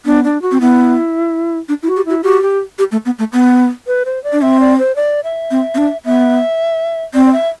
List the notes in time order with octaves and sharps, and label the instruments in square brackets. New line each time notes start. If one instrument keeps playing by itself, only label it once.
[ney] B3 [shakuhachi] D4
[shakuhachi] D4
F#4
[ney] C4
[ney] B3 [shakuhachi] E4
[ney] D4
E4
[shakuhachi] F#4
[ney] G4
[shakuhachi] E4 [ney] F#4
[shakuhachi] F#4 [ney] G4
[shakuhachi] G4
[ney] G4
A3
B3
A3
B3
[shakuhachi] B4
C5
D5
[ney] D4
[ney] C4 [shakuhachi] E5
[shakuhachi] D5
C5
D5
E5
[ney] C4
C4
D4
[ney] B3 [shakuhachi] E5
[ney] C4 [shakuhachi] D5
[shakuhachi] D5
E5